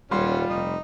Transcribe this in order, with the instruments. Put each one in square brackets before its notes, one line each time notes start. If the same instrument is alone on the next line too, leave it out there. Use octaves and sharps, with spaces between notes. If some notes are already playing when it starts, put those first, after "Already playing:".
[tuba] D#1 [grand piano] G3 C6 [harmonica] C#4 F#5 [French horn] F4
[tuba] F1 [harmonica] D#4